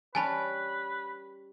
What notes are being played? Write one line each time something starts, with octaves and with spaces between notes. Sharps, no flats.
G3 C#4 B4 G#5 A5 B5